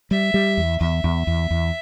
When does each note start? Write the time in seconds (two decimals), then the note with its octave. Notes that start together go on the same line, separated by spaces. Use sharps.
0.11 G3 E5
0.34 G3
0.57 E2
0.81 E2 E5
1.04 E2
1.27 E2
1.51 E2